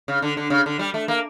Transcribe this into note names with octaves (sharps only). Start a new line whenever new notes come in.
C#3
D3
D3
C#3
D3
G3
A3
A#3